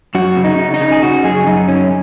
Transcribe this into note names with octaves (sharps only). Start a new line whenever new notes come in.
F#2 F#4
C#3
D#4
C#3
D#4
C#3
G#4
C#3 F#4
F#2 G#4
F#2 D#4
C#3 C#4